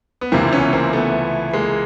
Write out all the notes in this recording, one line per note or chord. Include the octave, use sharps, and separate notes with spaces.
B3
C#2 C3 E3 A#3 C4
B3 C#4
A#3 C4
A3 B3
G#3 A#3